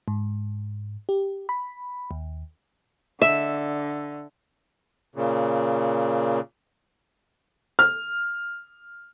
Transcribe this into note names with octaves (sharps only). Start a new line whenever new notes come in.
G#2
G4
B5
D#2
D3 E5
A#2 C#3
F6